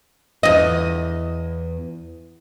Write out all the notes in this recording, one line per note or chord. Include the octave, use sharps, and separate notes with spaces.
E2 D#5